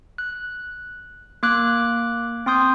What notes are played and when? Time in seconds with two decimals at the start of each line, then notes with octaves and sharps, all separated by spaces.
0.18 F#6
1.43 A#3 D6 F#6
2.46 C4 C6 D#6 G6